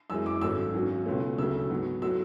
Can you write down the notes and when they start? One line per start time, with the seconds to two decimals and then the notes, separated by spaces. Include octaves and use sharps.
0.10 F#2 E3 G#3 E6
0.26 D6
0.41 G#1 G#2 F#3 A3 C#4 E6
0.74 G#1 G#2 F#3 C#4
1.06 C#2 B2 A3 C#4
1.38 D2 C#3 F#3 A3 E6
1.70 G#2 F#3 B3
2.02 F#3 A3 E6